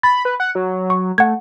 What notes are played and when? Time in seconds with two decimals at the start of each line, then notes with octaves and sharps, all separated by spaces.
0.03 B5 A6
0.25 B4
0.40 F#5
0.55 F#3
0.90 C#6
1.18 A3 F#5 G#6